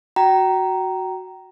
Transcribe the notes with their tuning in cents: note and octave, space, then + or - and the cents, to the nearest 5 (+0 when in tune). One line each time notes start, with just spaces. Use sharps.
F#4 +0 G5 -35 A#5 +0